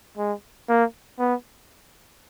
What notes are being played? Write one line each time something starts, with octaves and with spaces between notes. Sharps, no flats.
G#3
A#3
B3